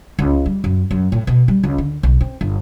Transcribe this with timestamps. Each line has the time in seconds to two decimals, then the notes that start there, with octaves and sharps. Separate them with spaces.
0.19 C#2
0.46 G3
0.64 F#2
0.91 F#2
1.12 A2
1.27 B2
1.48 G3
1.64 C#2
1.78 D3
2.03 B1
2.21 C4
2.41 G1